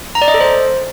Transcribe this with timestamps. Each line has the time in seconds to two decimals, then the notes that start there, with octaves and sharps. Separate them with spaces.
0.15 A#5
0.22 D5
0.28 D#5
0.34 A4
0.41 C5